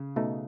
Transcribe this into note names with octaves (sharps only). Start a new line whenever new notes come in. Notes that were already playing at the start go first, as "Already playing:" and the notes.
Already playing: C#3
B2 A3 D#4